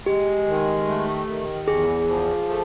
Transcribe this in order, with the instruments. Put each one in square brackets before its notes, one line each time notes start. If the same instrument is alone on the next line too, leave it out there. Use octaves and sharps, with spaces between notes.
[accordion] G#3 [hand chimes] G4
[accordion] D#3
A3
D#3
[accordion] E2 [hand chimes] G#4
[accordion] F3
A3